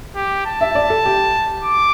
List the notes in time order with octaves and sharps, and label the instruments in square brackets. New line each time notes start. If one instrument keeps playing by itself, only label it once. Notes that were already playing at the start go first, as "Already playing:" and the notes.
[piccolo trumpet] G4
A5
[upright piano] E5
D5
A4
G4
[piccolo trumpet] D6